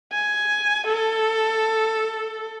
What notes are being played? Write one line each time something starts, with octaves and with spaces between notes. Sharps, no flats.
G#5
A4